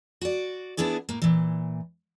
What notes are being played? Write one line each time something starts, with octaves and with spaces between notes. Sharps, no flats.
F#4 D5
B3 D4 E4 G#4 D5
A2 A#3
A#2 E3